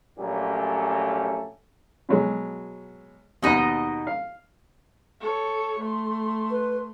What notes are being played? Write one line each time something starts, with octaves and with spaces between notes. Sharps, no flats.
A#1 A#2 F#3 A3 C#4 G4
B2 F#3 G#3
D#2 B2 B3 D#4 D#5 F#5
F5
A4 C#5
A3 C6
B4